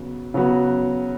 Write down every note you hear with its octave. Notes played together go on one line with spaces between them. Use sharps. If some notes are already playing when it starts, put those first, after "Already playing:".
Already playing: C#3 F#3 B3
C#3 F#3 B3 F#4